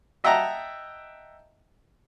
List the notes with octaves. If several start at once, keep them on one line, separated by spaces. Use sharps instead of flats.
D#5 E5 F#5 G5 A5 A#5